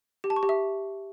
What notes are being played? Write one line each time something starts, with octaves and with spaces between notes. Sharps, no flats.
G4
A5
C#6
G4
E5